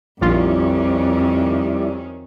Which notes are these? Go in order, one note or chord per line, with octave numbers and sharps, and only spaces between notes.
A#1 F2 D#3 G3 C#4 E4 F4 D5